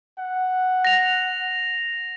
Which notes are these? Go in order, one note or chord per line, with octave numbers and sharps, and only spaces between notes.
F#5
A#6 F7